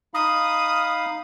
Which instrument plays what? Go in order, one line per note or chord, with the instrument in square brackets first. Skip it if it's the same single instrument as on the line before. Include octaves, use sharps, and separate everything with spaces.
[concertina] D#4 F5 B5 [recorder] D#6